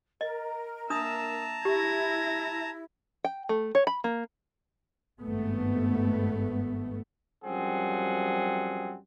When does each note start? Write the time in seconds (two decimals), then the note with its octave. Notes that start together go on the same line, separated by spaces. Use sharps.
0.21 A#4 D#5
0.90 A#3 D4 E5 A5 A#5 D#6
1.65 E4 G4 G#6 A#6
3.24 G5
3.49 A3
3.75 C#5
3.87 B5
4.04 A#3
5.21 G#1 G2 A3 B3
7.45 F#2 F3 G3 C4 G#4 F#5